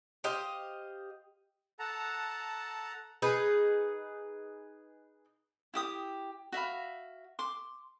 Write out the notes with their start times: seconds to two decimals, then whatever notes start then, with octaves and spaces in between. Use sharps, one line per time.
0.24 G4 C5 D#5 F5
1.79 A4 F#5 A5 A#5
3.22 D#4 G#4 B4
5.74 E4 G4 D#6
6.52 F#4 E5 F5 B5
7.39 C6 D6